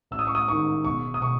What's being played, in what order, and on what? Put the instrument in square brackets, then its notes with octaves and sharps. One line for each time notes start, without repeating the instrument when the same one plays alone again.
[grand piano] A1 E6
D#6
C#6
D#6
G#2 D#3 C#6
E1 C#6
D#6
B2 C#6